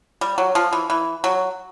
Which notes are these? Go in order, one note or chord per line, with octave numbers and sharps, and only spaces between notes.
G3
F#3
F3
E3
E3
F#3